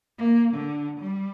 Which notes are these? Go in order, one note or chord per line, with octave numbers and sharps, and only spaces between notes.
A#3
D3
G3